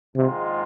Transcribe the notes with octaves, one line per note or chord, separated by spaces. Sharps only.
A#1 G#2 C3 D#3 G#3 F4